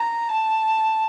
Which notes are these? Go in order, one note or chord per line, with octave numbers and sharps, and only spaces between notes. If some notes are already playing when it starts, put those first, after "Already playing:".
Already playing: A#5
A5